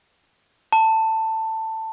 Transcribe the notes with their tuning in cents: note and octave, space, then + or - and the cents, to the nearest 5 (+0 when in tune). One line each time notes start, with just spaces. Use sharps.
A5 +15